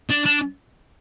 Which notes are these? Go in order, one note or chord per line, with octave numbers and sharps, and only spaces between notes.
D4
D4